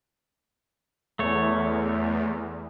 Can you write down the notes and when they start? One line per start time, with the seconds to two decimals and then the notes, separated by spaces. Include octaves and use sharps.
1.19 E2 A3 C#5